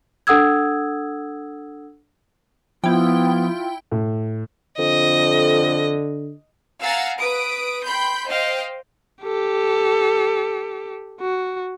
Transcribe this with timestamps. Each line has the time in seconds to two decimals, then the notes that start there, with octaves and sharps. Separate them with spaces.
0.27 D4 A4 F#5 D#6 E6 G#6
2.84 F3 B3 E4 F4 G5
3.92 A2
4.78 F2 D3 D#5
6.81 F5 F#5 G#5 A#5 E6 A6
7.18 B4 D#6 D7
7.86 G5 B5 C6 G6
8.26 C5 D#5 F5 G5
9.23 G4 A4
11.20 F#4